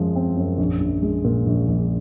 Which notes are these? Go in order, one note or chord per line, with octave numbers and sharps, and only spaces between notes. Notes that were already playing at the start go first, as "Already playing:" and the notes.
Already playing: F#2 F3 G#3
C4
F#2
A#1
A#1
G#3
A#2
A#1
A#1